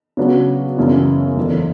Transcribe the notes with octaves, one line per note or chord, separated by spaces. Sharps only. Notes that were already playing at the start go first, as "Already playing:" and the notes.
C#3 F#3 B3 D4 F#4
F#2 C#3 E3
F#1 E2 D3